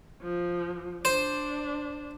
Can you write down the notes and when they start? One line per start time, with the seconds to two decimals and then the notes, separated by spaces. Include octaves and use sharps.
0.22 F3
1.05 D4 C5